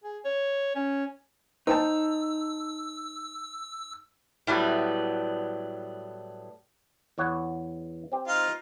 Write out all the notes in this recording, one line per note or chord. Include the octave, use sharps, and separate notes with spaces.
G#4
C#5
C#4
D#4 C5 G5 A5 E6
A2 F#3 G3 B3
E2 C#5 F#5
C4 G4
D#4 F4 F5